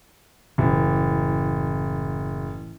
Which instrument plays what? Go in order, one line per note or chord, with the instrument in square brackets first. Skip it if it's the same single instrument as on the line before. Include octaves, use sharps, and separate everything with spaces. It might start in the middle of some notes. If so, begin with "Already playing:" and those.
[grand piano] F#1 [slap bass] A2 E3